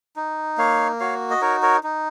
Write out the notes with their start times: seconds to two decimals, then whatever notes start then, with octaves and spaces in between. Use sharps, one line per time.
0.16 D#4
0.58 A#3 C#5 F5
1.00 F#4 C#5 F5
1.30 D#5
1.42 D#4 A#4 C#5
1.63 A#4 C#5
1.83 D#4